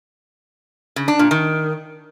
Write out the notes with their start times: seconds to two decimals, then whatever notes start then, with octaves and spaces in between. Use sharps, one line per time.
0.96 C#3
1.08 D4
1.19 A#2
1.31 D#3